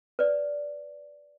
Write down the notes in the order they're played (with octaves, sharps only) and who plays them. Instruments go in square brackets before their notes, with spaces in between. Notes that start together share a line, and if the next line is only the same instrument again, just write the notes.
[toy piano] B4 D5